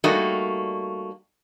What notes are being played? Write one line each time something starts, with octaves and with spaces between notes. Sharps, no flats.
G3 A3 A#3 D#4 F#4